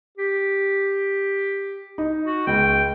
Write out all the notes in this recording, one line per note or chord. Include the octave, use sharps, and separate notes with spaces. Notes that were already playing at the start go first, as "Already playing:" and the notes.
G4
D#4
F#4
C#2 G5